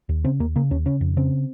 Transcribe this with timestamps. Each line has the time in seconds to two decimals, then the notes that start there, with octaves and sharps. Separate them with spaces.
0.09 D#2
0.24 C#3 C4
0.40 D#2 A#3
0.56 C#3 A#3
0.71 D#2 C#4
0.86 C#3 C#4
1.01 F2
1.17 C#3 C4